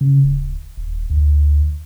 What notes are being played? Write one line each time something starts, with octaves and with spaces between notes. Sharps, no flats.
C#3
D1
D#1
D2